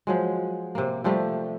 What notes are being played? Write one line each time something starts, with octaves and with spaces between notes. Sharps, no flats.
F3 F#3 G#3
C3 A#3
C3 F3 G3 A3